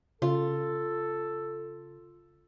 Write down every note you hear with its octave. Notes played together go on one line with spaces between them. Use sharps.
C#3 F4 A4